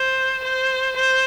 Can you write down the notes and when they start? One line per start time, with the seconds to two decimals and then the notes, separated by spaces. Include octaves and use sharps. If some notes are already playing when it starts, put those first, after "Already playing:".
Already playing: C5
0.44 C5
0.96 C5